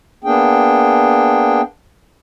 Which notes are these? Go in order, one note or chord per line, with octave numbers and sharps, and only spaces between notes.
A#3 B3 D4 G#4 G5